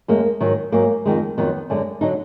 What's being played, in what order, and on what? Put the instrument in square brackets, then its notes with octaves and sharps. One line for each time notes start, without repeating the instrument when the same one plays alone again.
[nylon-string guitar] F#2 D3 G#3 A#3
G#2 D#3 F#3
G#2 F#3 A#3
F2 D#3 G#3
F2 D#3 F#3 B3
F#2 D3 G#3
D3 F#3 D#4